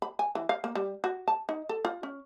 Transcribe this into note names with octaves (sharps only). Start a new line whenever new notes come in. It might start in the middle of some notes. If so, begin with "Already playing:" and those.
B5
G#5
E3
F5
A#3
G3
F#4
A5
D#4
A4
F4
C#4